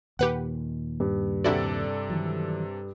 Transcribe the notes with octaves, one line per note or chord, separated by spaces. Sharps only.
D#2 A#2 D#3 G4 B4 F#5
G2
C3 D4 E4 F#4 A4 D5
D#3 E3 F#3